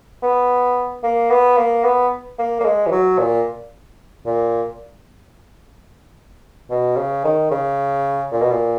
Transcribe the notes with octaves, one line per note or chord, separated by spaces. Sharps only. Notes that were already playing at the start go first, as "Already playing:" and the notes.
B3
A#3
B3
A#3
B3
A#3
A#3
G#3
E3
F#3
A#2
A#2
B2
C#3
D#3
C#3
A#2
B2
A#2